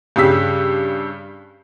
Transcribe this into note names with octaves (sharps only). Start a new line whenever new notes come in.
G2 C#3 G4 E6 B6